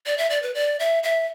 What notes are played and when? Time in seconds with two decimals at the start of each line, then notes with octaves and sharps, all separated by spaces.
0.06 D5
0.18 E5
0.30 D5
0.42 B4
0.54 D5
0.80 E5
1.03 E5